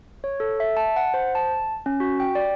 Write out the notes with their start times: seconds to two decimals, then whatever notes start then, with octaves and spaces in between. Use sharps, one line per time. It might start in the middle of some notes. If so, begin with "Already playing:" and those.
0.24 C#5
0.40 A4
0.60 E5
0.77 A5
0.96 F#5
1.14 C5
1.35 A5
1.86 C#4
2.00 F#4
2.20 G5
2.35 D5